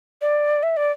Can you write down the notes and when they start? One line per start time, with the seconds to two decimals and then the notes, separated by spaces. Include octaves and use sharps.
0.22 D5
0.63 E5
0.77 D5